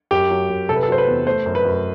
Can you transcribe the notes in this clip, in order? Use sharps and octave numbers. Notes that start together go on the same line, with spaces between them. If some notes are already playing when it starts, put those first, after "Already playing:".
F#2 G4
F#3
F#2
C3 A4
B4
A4
F#3 C5
B4
E2
A3 C5
F#2
B4
F#2